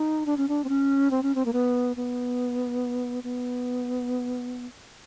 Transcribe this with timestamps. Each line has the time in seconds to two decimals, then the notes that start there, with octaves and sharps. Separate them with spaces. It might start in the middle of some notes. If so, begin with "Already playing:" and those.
Already playing: D#4
0.26 D4
0.37 C#4
0.48 D4
0.64 C4
0.69 C#4
1.11 C4
1.23 C#4
1.35 C4
1.45 A#3
1.53 B3
1.96 B3
3.23 B3